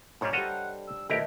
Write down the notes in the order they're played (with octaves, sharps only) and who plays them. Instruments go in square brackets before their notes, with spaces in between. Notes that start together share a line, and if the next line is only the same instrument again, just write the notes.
[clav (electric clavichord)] G#2 G3 [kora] D4 C#5 F5
[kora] G3 C5 F5 [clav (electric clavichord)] A4 D#5 A#5 [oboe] F#5
[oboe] E6
[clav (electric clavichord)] B1 G4 A#4 [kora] D#3 A3 D4 [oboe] E4